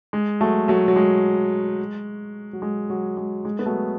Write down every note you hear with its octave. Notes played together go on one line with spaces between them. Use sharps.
G#3
F#3 A3
F#3 A3
F#3
G#3
F#3
G#3
F#3
G#3
G#3
B3
F#3 A3